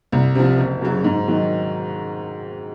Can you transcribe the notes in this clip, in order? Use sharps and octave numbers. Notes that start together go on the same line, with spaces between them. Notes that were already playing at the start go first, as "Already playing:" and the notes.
C2
C3 F3
F#1
F#2 C#3 F#3
G#2
D#3 F#3